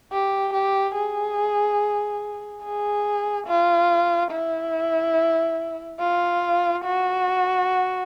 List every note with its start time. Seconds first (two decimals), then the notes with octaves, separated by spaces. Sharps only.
0.12 G4
0.54 G4
0.95 G#4
2.63 G#4
3.47 F4
4.31 E4
6.00 F4
6.84 F#4